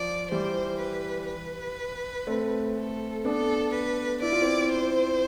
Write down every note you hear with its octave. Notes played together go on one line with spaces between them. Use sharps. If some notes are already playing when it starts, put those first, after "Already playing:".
Already playing: F3 D5
E3 G3 C5
B4
B4
A3 C4
A4
B3 D4 A4
B4
E4 D5
F4
C4 E4
C5